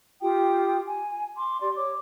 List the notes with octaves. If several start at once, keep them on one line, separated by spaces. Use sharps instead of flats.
F4 G4 G5 D#6
G#5
C6 D6
G4 D5 C6
C#5 D6